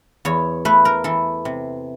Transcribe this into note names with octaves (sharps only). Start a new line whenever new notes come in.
E2 C#5
A3 B4
A#4
E3 A4
C3